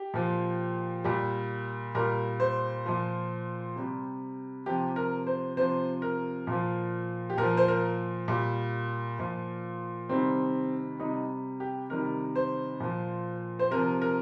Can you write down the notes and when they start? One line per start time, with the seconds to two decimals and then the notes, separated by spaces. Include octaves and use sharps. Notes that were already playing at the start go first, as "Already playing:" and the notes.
Already playing: G4
0.14 A#2 F3
1.04 A#2 G3
1.95 A#2 G3 A#4
2.40 C5
2.86 A#2 F3
3.76 C3 G3
4.66 C3 F3 G4
4.96 A#4
5.27 C5
5.57 C3 F3 C5
6.02 A#4
6.47 A#2 F3
7.30 G4
7.38 A#2 F3 A#4
7.57 C5
7.68 A#4
8.28 A#2 G3
9.19 A#2 F3
10.09 C3 D#3 G3 C4
10.99 C3 G3 D#4
11.60 G4
11.90 C3 D#3 G3 A#4
12.36 C5
12.80 A#2 F3
13.59 C5
13.71 C3 F3 A#4
14.02 A#4